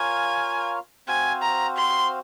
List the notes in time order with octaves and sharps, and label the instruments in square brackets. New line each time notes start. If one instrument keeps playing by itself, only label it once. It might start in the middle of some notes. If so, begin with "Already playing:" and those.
Already playing: [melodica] F4 A#4 C#5 F5 [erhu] G#5
[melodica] C4 F#4 C5 F5 [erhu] G#5
[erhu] A#5
C6